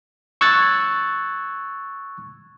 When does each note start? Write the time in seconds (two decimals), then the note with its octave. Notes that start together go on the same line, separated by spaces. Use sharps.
0.41 C#6 E6 F#6 G#6 A6